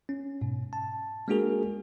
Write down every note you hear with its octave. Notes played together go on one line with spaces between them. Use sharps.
C#4
G#2 B2
A5
G#3 A#3 D4 F#4 G#4 A#4